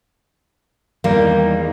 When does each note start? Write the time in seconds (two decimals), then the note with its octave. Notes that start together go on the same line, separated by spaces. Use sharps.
1.04 E2 D#3 G3 A#3